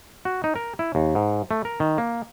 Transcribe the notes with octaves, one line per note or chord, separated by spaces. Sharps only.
F#4
D#4
A#4
E4
D#2
G#2
A3
A#4
D#3
A#3